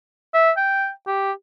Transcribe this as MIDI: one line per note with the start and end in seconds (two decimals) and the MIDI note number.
0.34 0.51 76
0.57 0.90 79
1.07 1.32 67